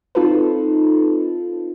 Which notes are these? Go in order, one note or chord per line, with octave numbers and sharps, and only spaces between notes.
C4 D#4 F4 A4 B4